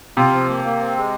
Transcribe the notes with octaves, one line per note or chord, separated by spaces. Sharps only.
C3 F4
F3
A#3
A#3
C4
G#3